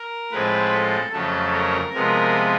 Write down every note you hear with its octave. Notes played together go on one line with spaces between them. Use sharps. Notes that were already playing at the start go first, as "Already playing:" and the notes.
Already playing: A#4
A2 F3 G#3 C4 B4
A4
F2 C#3 F#3 A3 A4
A#4
C3 F3 G#3 B3 A#4